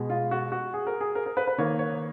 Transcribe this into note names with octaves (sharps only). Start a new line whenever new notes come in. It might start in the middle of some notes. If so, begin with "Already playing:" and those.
Already playing: B2 G#3
F4
F#4
F#4
G#4
A#4
G#4
A#4
A#4
B4
B4
D#3 A#3 C#5
C#5